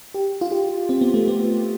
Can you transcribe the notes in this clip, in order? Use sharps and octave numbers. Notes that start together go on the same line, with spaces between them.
G4
F4
G4
C4
B3
A3
B3